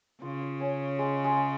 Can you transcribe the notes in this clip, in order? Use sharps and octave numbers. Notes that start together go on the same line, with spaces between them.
C#3 F4
F4
C#4
G#3
G#3